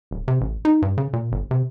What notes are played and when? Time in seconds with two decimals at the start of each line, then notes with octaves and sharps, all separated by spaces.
0.11 D1
0.28 C3
0.41 A1
0.65 D#4
0.82 G2
0.98 C#3
1.13 A#2
1.32 G1
1.51 C3